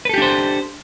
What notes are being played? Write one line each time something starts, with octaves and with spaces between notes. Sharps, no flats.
D4 G4 A4 B4 C5